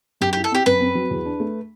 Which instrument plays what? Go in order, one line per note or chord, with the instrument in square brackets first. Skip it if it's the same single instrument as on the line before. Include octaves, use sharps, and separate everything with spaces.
[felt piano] F#2 [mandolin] G4
[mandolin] G4
[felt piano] E4
[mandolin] A4
[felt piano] C4 [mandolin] G4
[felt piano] F#2 [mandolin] B4
[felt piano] C4
F#3
E2
D4
A3